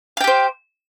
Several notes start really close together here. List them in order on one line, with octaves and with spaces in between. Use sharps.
F5 G5 G4 C5